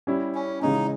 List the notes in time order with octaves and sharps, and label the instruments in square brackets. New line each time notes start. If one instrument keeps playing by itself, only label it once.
[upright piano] G3 C#4 E4
[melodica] C#4
[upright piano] C#3 E3 G#3 C#4 [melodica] D#4